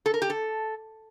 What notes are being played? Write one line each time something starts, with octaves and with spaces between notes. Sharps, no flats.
A4
A#4
G4
A4